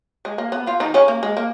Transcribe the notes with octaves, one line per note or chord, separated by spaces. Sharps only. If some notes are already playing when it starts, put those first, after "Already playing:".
G#3
A#3
B3
F3 F4
D#3 D#4
C#3 C#4
A#3
G#3
A#3